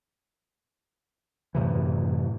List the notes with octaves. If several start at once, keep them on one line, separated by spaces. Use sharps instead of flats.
F#2 A2 C3 E3